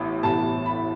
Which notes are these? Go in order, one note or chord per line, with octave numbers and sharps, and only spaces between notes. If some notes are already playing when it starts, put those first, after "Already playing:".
Already playing: A1 A2 B3
A1 A2 G3 B3 A5
B5